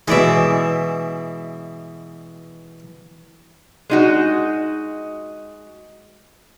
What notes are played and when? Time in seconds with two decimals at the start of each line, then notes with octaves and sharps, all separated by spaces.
0.08 B2 E3 G#3 D5 E5
3.90 G#3 D#4 F#4